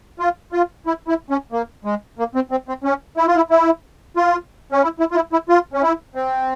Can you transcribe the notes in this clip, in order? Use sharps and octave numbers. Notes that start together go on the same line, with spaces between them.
F4
F4
E4
E4
C#4
A#3
G#3
A#3
C4
C4
C4
C#4
E4
F4
E4
E4
F4
C#4
E4
E4
F4
E4
E4
F4
C#4
E4
C4